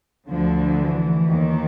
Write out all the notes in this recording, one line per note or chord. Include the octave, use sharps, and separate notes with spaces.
D2 D3 F3
E3
D#2 D#3